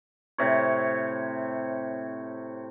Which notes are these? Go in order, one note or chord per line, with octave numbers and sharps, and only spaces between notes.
A2 C3 C#5